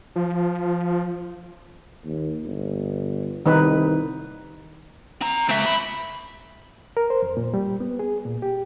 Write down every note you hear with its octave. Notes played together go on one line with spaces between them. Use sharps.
F3
D#2
G1
C2 D#3 D#4 B4
C4 A#5
C#2 C4 E5
B5
A#4
C5
F2
A#2
G3
B3
G#4
A#2
G4